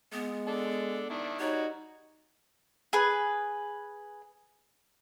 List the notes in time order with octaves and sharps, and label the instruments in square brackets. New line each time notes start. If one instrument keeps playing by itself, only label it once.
[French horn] G#3 [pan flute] B3
[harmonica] D4 A4
D#3 D4 E4
[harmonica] G3 F#4 [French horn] D#4 [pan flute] C#5
[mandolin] G#4 B4